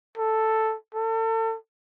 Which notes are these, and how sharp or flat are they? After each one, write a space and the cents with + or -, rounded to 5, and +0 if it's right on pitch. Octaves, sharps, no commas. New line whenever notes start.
A4 +0
A4 +35